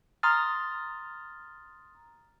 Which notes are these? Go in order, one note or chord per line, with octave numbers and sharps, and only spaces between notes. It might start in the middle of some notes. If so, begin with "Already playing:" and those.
A#5 C6 D#6 F6 A6